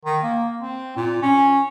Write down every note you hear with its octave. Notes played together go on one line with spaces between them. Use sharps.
D#3
A#3
C4
A#2
C#4